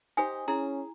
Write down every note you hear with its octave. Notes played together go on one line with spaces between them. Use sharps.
D#4 G4 C5 G#5
C#4 E4 G#4 A#5